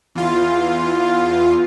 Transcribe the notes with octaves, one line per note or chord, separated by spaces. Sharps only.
E2 F4